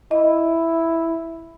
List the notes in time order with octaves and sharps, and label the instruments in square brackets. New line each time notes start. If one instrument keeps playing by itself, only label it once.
[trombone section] E4 [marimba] D#5